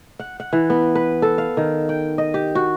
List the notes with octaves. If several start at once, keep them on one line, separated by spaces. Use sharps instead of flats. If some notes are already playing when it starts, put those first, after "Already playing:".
F#5
F#5
E3
B3
B4
A4
F5
D#3
G5
D#5
G4
F#4